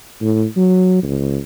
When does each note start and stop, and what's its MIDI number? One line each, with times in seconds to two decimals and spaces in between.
0.22 0.45 45
0.56 1.01 54
1.03 1.38 37